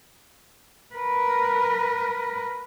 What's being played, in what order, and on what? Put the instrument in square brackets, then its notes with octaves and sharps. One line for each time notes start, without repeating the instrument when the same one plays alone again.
[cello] A#4 B4